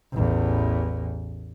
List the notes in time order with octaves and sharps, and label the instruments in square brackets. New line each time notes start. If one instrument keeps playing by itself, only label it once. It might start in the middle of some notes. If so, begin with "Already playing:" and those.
[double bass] A1 E2